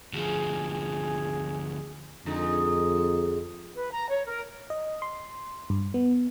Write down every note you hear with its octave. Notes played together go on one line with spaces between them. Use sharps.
D2 F3 G#4
F2 D3 G#3 D#4
B4
A#5
C#5
A#4
D#5
C6
G2
B3